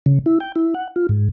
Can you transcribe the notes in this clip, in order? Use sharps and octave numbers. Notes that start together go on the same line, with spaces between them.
C#3
E4
G5
E4
F#5
F4
G#2